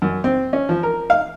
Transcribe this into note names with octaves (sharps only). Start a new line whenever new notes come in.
F#2
C4
C#4
F3
A#4
F5